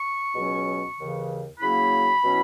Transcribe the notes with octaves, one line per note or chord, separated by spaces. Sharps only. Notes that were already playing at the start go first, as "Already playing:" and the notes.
Already playing: C#6
C#2 B2 F#3 C#4
D#2 C#3 E3
C#3 F#3 A#3 E4 B5
B2 F#3 C#4 E4